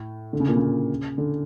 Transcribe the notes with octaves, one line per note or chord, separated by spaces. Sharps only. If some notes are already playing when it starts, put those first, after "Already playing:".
Already playing: A2
D3
C#3
A#2
C#3
D3